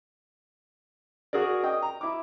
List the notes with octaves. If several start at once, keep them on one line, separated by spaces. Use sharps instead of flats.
F#4 G#4 A#4 D5
D#5 G5 D#6
A#5
E4 D6